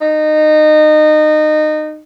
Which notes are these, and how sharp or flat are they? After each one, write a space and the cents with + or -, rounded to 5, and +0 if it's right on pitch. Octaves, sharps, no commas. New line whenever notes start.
D#4 -25